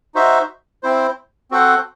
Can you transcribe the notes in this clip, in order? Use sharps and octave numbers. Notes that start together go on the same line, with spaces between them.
D#4 F#4 C5 E5
C4 E4 C5
C4 F#4 A4 C5 F#5